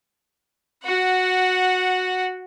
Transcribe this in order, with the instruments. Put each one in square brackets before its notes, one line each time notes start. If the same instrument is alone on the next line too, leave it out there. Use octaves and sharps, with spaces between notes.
[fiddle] F#4 F#5